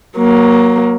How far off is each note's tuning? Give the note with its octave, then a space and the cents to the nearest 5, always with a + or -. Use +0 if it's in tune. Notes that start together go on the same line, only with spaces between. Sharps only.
F#3 +0 A#3 +20